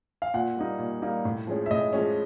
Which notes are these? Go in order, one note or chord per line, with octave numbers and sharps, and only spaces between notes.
F5
A#2 F#5
G3 A#3 D#4
A#2
G3 A#3 D#4
A2
F3 G#3 C#4
E5
A2 D#5
F3 G#3 C#4